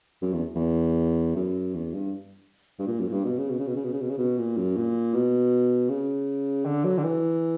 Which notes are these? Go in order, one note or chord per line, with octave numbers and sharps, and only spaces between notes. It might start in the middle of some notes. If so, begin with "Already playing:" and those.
F#2
E2
E2
F#2
E2
G2
G2
A#2
F#2
A#2
G2
B2
C#3
B2
C#3
B2
C#3
B2
C#3
B2
C#3
B2
A#2
F#2
A#2
B2
C#3
D3
F#3
D3
E3